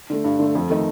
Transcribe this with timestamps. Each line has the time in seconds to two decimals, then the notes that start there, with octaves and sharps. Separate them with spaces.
0.10 D3 A3
0.24 G2
0.39 D3 A3
0.55 F2
0.70 D#3 A3 D#4